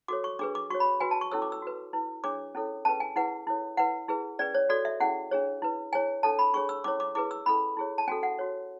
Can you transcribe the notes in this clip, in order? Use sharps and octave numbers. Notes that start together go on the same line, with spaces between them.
F#4 A4 C#5 D6
C#6
D4 G#4 B4 D6
D6
F#4 C#5 C#6
B5
F#4 B4 G#5
A5
C#6
C#4 E4 A4 C#5 E6
D6
E6
F#4 B4
E4 B4
D4 G#4 C#5 D6
C#4 E4 A4 C#5
C#4 G#4 B4 A5
G#5
E4 G#4 B4 F#5
E4 A4 C#5
E4 B4 F#5
E4 G#4 B4
C#4 G#4 B4 D5
C#5
F#4 A4 C#5 D5
E5
C#4 E4 G#4 F#5
D4 G#4 C#5
E4 B4
E4 G#4 C#5 G#5
D4 A4 C#5 A5
B5
D4 G#4 C#5 C#6
E6
C#4 E4 A4 C#5 D6
D6
E4 G#4 B4 D6
E6
C#4 E4 A4 B5
E4 G#4 C#5
A5
C#4 F#4 A4 G#5
F#5
F#4 C#5